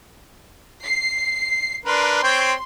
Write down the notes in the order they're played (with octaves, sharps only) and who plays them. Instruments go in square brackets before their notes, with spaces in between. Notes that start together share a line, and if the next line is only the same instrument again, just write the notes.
[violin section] C7
[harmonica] D4 A#4 B4 [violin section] C6
[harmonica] C4 C#5 G5